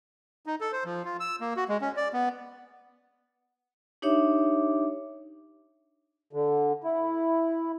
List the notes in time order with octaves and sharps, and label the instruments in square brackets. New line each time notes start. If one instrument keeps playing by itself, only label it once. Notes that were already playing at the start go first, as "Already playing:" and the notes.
[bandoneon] D#4
A4
C5
F3
F4
E6
A#3
F#4
G#3
C#4
D5
B3
[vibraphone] D4 D#4 G4 C#5 E5 D6
[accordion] D3
E4